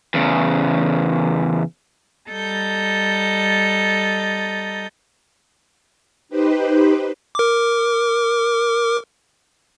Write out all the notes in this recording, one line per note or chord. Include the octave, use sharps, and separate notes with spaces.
E2 C#3
G3 A4 D#5 A#5 G6 A6
D#4 G4 B4 C5
A#4 D6